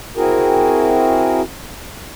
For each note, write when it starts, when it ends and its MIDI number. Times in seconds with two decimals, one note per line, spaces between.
0.17 1.41 60
0.17 1.41 64
0.17 1.41 66
0.17 1.41 68
0.17 1.41 70